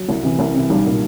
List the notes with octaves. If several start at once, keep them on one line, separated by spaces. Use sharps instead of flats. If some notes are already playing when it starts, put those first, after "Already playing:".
Already playing: F#3
C2
C3 E3
C2
C3 E3
B1 G3
A#2